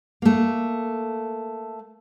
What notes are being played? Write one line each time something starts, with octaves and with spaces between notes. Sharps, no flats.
A3 A#3